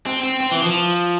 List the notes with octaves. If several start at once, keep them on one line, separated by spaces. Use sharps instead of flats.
C4
C4
C4
E3
F3